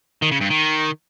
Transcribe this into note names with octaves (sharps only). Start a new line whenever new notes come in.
D#3
C#3
G2
D#3